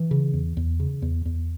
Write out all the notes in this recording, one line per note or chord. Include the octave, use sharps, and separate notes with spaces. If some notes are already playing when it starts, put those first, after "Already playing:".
Already playing: E3
C#3
E2
E2
C#3
E2
E2